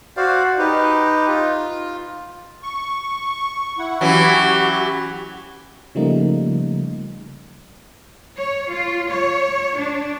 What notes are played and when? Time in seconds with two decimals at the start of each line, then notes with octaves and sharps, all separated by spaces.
0.17 F#4 C5 D5 F5
0.59 D#4 G4 B4
1.28 F4
2.63 C#6
3.78 E4 F#5
4.01 E3 F#3 C#4 F#4 G4
5.95 C#3 F3 G3 A3 A#3 D#4
8.37 C#5
8.71 F4
9.10 C#5
9.77 D4